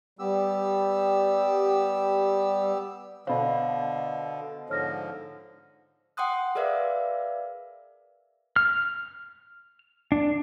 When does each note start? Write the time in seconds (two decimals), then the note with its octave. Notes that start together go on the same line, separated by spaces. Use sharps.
0.19 G3 B3 G4 E6
3.27 B2 D3 C5 F5 B5
4.70 G#2 D3 F3 C#5 F6 A#6
6.17 F#5 G5 C6 D#6 F#6
6.55 G#4 A#4 B4 D5 E5 F5
8.56 F6
10.12 D4